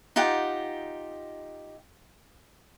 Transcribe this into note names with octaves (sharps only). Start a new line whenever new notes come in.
D#4 F4 G4 F#5